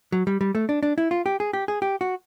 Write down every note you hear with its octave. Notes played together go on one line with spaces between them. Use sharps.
F#3
G3
G3
A3
D4
D4
E4
F4
G4
G#4
G4
G#4
G4
F#4